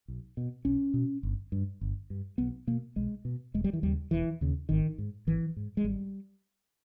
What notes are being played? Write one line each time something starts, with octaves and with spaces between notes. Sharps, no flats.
B1
B2
B1 C#4
B2
G1
G2
G1
G2
B1 B3
B2 A#3
B1 G#3
B2
E1 G#3
G3
E3
D#2 C#3 G3
E1 E3
D#2 C#3
G#1 D#3
G#2
G#1 E3
G#2
G#3
G#1 G3